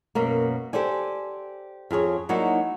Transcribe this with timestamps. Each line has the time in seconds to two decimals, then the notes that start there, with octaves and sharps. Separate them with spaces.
0.15 F#2 B2 A#3
0.73 G4 A4 C5 D5 G#5
1.91 F2 F4 G#4 C#5
2.29 F#3 A#3 D#4 E4 F#4 D5